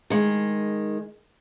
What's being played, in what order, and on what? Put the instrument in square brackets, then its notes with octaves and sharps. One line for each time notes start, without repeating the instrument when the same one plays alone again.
[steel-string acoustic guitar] D#3 G#3